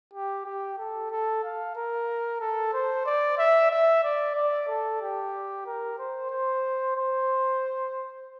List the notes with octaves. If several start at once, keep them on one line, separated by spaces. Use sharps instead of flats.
G4
G4
A4
A4
F5
A#4
A4
C5
D5
E5
E5
D5
D5
A4
G4
A#4
C5
C5
C5